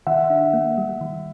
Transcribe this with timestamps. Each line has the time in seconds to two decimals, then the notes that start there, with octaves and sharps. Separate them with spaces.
0.07 D#3 E5 F#5
0.30 D4
0.53 A#3
0.78 G3
1.01 D#3